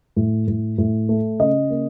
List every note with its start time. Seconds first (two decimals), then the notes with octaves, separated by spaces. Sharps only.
0.16 A2
0.48 A2
0.78 A2
1.09 A3
1.39 C#3 D#5
1.70 A#3